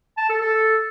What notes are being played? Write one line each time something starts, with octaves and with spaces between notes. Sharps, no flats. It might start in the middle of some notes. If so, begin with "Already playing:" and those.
A5
A4
A4